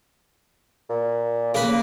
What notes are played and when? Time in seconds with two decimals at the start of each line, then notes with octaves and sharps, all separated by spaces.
0.90 A#2
1.54 C#3 A#3 B4